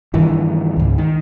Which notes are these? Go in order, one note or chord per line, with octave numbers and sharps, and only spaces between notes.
G2 D#3 E3
C#2 G#2
D#3